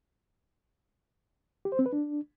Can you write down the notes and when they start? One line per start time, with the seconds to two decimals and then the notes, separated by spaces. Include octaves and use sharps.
1.65 G4
1.72 C5
1.79 C4
1.86 B4
1.93 D4